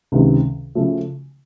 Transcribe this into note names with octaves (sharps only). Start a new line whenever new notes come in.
C#2 C3 D#3
C#3 F3 A3